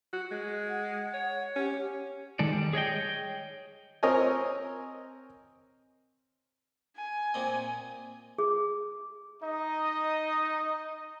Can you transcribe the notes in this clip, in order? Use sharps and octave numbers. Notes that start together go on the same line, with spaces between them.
F#4
G#3
F#5
C#5
C#4 G4
D#3 G#3 A4 D5
G3
G#4 C#5 D#5 G5
C4 A#4 C#5 D#5 G#5
G#5
A#2 C4 D#5
G#4
D#4 D#5